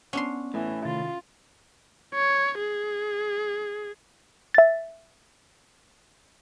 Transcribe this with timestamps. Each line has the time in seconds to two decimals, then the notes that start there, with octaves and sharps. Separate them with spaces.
0.13 B3 C#4 D4 F#5 C6
0.54 A2 E3
0.85 C3 D#3 F4 A6
2.15 C#5
2.59 G#4
4.54 E5 A6